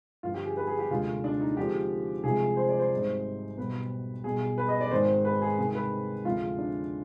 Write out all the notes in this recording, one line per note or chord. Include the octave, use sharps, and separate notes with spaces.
G1 G2 F3 F4
G4
G#4
B4
G#4
G4
F1 D#2 D3 G#3 F4
D4
D#4
F2 D3 F3 G#3 G4
C2 C3 F3 G#3 G#4
C5
D5
C5
G#1 G#2 G3
B1 B2 G3 B4
B1 B2 G3 G#4
B4
D#5
D5
G#1 G#2 D#3 G#3 C5
B4
G#4
C2 C3 D#3 G#3 G#4
B4
D2 C3 F3 G#3 F4
D4